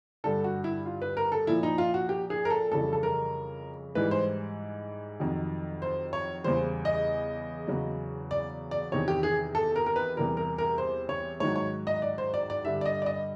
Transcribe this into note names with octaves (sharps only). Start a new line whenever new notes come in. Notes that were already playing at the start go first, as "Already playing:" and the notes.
G2 D3 G3 A4
F#4
E4
F4
B4
A#4
A4
A#2 F3 E4
D#4
F4
F#4
G4
G#4
A#4
A4
F2 C#3 E3 G3 A4
A4
A#4
G#2 E3 G3 B4
C5
F2 C3 D#3 F#3
C5
C#5
E2 C#3 E3 G3 C5
D#5
E2 C#3 F#3
D5
D5
E2 C3 D#3 C#5
G4
G#4
A4
A#4
A#4
B4
E2 C3 E3 G3 A#4
A#4
A#4
C5
C#5
G#2 D#3 F#3 C#5
C#5
D#5
D5
C5
D5
D5
G2 D3 G3 E5
D5
D#5
D5
D#5